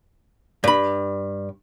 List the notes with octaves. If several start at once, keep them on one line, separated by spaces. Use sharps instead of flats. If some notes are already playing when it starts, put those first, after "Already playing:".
G2 B5